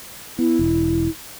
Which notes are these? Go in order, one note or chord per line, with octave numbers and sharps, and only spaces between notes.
B3 E4
E1